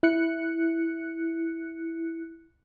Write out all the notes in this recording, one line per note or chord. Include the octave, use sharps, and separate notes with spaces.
E4 F#6 C#7